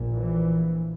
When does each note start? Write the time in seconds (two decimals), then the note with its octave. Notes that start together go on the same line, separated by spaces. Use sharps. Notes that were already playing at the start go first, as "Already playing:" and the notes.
Already playing: A#1 A#2
0.13 E3